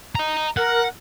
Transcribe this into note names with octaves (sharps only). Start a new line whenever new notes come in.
D#5 A#5
A#4 F#5